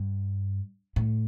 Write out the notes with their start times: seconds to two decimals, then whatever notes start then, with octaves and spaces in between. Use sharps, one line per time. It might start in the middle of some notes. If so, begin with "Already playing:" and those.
Already playing: G2
0.96 A2